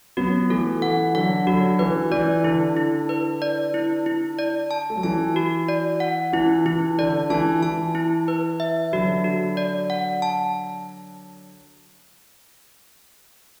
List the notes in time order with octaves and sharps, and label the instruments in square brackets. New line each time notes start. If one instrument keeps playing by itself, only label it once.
[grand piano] F#3 B3 [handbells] F#4
[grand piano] E3 A3 [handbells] A4
[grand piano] E3 [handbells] F#5
[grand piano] D3 F#3 [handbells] F#5
[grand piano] D3 F#3 [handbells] F#4
[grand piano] E3 [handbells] B4
[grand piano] E3 [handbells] D5
[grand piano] D3 [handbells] E4
[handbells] E4
B4
D5
E4
E4
D5
A5
[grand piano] A3
F#3
[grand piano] E3 [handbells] A5
[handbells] F#4
D5
F#5
[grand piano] E3 [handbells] E4
[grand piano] E3 [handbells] E4
[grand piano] D3 [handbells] D5
[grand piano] E3 [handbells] A5
[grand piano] E3 [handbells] A5
[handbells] E4
B4
E5
[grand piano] D3 F#3 [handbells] F#4
[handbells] F#4
D5
F#5
A5